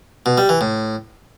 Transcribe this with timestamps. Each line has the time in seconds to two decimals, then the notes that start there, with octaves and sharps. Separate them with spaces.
0.26 B2
0.38 G3
0.49 E3
0.61 A2